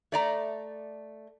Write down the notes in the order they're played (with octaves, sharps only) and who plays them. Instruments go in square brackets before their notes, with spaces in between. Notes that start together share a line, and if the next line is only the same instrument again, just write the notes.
[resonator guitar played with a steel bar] A3 D5 A#5